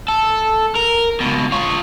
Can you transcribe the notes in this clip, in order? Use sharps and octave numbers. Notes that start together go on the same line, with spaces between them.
A4
A#4
C#2 B2
F4 C#5